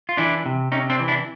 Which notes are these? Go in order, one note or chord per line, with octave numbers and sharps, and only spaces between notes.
F4
E3 D4 E4
C3
C3 C#4 D#4
C4 D4
E3
D4 E4